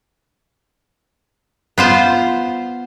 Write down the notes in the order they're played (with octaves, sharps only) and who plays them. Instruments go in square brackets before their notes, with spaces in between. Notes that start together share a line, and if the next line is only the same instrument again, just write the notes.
[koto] B3 F4 C5